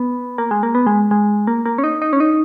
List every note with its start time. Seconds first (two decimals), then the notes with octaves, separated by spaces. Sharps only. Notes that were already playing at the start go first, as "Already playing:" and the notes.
Already playing: B3
0.38 A#3
0.51 G#3
0.63 A#3
0.75 B3
0.87 G#3
1.11 G#3
1.47 A#3
1.66 A#3
1.78 C#4
1.84 D#4
2.02 D#4
2.13 C#4
2.20 D#4